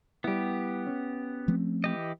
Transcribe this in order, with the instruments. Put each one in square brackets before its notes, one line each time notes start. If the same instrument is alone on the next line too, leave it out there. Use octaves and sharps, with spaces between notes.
[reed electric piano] G3 E4 [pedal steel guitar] B3 G4
[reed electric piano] C#4
[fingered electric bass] F3 A3 C4
[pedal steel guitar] E3 G4 D#5